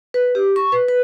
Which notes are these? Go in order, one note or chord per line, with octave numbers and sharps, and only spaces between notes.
B4
G4
C#6
B4
B4